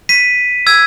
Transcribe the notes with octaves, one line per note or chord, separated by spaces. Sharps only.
B6 D#7
E6 G#6